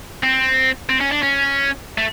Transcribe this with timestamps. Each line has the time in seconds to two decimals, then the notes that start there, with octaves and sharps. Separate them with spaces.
0.23 C4
0.89 C4
1.00 C#4
1.12 D4
1.22 C#4
1.98 A3